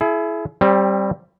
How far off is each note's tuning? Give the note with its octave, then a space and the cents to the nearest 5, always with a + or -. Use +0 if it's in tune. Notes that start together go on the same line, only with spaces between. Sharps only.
E4 +15 G#4 +40
G3 +0 C4 +25